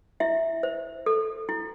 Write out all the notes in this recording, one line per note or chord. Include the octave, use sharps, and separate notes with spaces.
E4 E5
C5
A4
E4